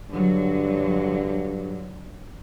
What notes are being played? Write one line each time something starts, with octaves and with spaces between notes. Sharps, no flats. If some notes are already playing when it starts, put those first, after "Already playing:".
G2 D3 F#3